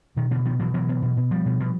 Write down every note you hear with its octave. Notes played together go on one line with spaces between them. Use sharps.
B2 D#3
B2 D3 E3
B2 D#3 F3
B2 E3 F#3
B2 E3 F#3
B2
B2
B2
B2 F3 G3
B2
B2